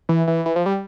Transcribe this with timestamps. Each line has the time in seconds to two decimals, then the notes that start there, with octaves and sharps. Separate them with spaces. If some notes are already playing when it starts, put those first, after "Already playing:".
0.09 E3
0.28 E3
0.46 E3
0.56 F3
0.66 G3